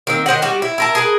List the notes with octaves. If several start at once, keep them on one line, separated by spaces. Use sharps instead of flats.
D#3 A#3 C4
D#3 C5 D#5 F#5
G3 F#4 G4
E4
E4 A#4 A5
G#4 A#4 B4